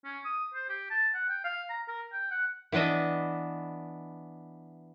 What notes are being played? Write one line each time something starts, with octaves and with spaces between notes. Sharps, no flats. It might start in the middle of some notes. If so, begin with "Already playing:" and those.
C#4
D#6
C5
G4
A5
F#5
G5
F5
A#5
A#4
G5
F#5
E3 B3 D4 D#5 E5